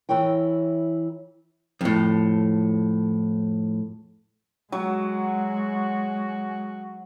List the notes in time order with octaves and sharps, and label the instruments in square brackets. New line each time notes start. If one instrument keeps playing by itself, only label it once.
[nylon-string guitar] E3 E4 A#4 C#5 G5
[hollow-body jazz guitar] F2 A2
[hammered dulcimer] F#3 [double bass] G#3 [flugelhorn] F#4